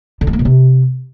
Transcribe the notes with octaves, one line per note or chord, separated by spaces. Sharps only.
D3
G3
A#3
B2
C3